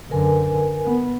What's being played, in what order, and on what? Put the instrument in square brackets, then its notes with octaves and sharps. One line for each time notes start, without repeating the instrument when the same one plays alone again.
[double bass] F#2 D3 [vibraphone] A#4 B4 G#5
[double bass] B3